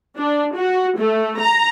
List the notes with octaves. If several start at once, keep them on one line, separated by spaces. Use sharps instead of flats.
D4
F#4
A3
A#5